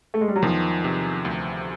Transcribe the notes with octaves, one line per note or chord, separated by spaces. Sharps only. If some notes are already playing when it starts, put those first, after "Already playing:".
A3
G#3
G3
F#3
E2 D#3 F3
C3
D2